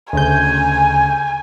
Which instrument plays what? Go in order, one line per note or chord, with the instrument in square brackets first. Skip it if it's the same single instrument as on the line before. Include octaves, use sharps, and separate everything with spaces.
[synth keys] D2 C#3 G6 [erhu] G#5